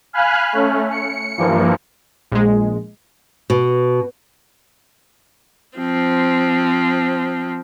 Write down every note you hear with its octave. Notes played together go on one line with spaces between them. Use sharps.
F5 G#5 B5 F6 F#6
A3 C#4
C#7
G2 E3 F3 A#3
A#1 G#3
B2
F3 C4